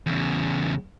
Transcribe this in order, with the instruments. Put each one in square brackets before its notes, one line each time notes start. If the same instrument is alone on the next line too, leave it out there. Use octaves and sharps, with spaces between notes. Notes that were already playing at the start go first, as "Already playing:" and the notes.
[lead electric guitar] E2 C#3